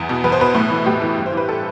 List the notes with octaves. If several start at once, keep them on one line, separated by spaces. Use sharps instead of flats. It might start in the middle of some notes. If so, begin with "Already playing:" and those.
Already playing: E2 F#5
B2
E2 B4
C5
B2 B4
A2
E3
A2 G4
E3
G2
C5
E3
B4
A4